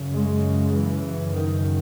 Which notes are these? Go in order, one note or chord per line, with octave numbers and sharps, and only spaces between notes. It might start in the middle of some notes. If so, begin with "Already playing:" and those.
Already playing: F#2 C#3
G#3
E3
F#2 C#3
D#3